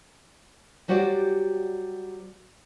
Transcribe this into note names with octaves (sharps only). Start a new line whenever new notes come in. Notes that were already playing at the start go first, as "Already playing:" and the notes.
F#3 G3 F#4 G4 C5 D5